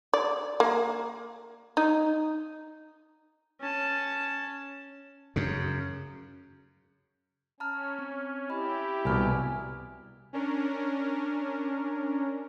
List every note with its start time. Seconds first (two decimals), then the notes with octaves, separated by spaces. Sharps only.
0.13 D5
0.60 A#3
1.77 D#4
3.60 C#4 A5
5.36 F#2 C#3
7.60 C#4 A5 A#5 F6
7.99 C4
8.50 E4 G4 D#5 B5
9.05 C2 B2 G#5 F6
10.33 C#4 D4 A#4